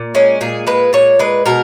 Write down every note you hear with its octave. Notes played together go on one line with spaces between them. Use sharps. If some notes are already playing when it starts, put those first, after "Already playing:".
Already playing: A#2
G#3 C#4
A#2 G#4
G#3 B4
A#2 C#5
G#3 B4
B2 A#4